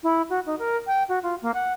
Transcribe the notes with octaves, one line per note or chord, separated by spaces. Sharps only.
E4
F#4
D#4
A#4
G5
F#4
F4
A#3
F#5